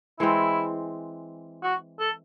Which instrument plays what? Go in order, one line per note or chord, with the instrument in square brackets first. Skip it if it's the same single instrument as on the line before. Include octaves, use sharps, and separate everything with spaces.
[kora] E3 G#3 C4 [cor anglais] E4
[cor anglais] F#4
A4